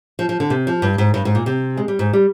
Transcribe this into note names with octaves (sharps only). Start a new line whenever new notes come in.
F3
F3
D3
C3
F3
G2
G#2
G2
G#2
A#2
C3
G#3
G3
G#2
G3